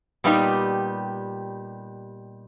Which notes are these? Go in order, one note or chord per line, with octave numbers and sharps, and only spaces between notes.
A#2 G3 B3 D#4 G4